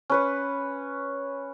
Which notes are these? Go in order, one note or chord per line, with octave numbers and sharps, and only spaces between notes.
C#4 B4 C#5